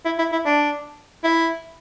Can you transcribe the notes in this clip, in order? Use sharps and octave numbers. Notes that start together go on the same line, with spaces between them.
E4
E4
E4
D4
E4